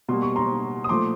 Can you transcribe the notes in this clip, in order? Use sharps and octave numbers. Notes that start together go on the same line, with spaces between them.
B2 G3 A#3 C6
C#6
A#5 C6
D#6
A#2 F3 A3 C6 D6